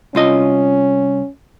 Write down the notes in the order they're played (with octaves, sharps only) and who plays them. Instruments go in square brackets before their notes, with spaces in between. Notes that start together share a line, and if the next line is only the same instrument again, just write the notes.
[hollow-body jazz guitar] C2 F4 D#5 [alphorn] C#4